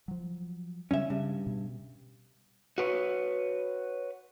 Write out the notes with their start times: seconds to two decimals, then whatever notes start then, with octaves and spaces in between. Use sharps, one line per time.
0.08 F3 F#3
0.91 C#3 G3 G#3 C#4 E5
1.10 G2 C#3
1.46 B2
2.78 F#4 B4 C#5